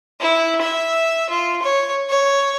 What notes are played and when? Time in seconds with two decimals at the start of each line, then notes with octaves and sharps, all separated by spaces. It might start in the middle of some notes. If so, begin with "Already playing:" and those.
0.21 E4
0.61 E5
1.30 F4
1.62 C#5
2.09 C#5